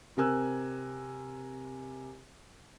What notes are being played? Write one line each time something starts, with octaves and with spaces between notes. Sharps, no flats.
C3 C4 A#4 G#5 E6 F#6